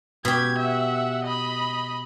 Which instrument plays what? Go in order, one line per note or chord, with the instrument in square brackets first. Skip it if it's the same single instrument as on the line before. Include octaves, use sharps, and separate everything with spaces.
[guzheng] B2 G4 [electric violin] G#6
[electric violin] E5 F#5
D#5 B5